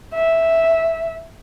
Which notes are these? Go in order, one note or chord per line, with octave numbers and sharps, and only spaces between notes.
E5